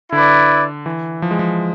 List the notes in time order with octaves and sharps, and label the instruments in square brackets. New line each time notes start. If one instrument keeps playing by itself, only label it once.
[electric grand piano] D3 [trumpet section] E4 B4 D5
[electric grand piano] E3
F3
G#3
F3